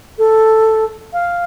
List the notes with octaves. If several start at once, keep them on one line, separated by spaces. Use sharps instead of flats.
A4
F5